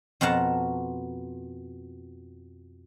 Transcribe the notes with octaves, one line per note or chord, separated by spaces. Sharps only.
F2 B2 A#4 F#5 A5